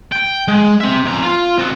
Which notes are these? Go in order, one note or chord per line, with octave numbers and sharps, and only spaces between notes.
G5
G#3
C4 E5
F2 A#5
F4
C4 F#4